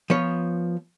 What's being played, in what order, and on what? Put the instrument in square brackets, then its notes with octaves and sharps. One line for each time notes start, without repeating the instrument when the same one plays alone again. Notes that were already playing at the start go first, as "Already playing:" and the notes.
[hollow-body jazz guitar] F3 B3 C#5